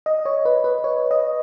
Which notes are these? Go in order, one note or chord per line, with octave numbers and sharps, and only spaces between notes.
D#5
C#5
B4
B4
C#5
D#5